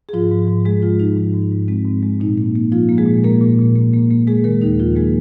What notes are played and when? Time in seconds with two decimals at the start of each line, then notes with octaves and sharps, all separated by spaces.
0.09 G#4
0.13 G#2 F3 F4
0.31 G#2
0.48 G#2
0.65 G#2 G#3 G#4
0.82 G#2 F3 F4
1.00 F3 D#4
1.17 G#2
1.34 G#2
1.52 G#2
1.68 G#3 C4
1.86 G#2
2.03 G#3
2.20 A#2 D#4
2.38 A#3
2.55 A#3
2.72 F3 A#3 F4
2.89 A#3
2.98 G#3 G#4
3.06 A#2
3.24 A#3 A#4
3.41 A#2
3.59 A#2
3.76 A#3
3.93 A#3
4.11 A#3
4.27 G#3 A#3 G#4
4.44 D#3 A#3 A#4
4.62 D#2 D#4
4.79 D#3 F3 F4
4.96 G#3 A#3 G#4